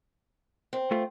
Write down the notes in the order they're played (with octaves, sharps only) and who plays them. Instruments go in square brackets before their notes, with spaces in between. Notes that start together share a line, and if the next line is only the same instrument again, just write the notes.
[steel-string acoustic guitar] C4
[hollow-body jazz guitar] A3 F4